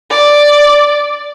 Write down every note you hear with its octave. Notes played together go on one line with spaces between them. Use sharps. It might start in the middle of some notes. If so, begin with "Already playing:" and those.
D5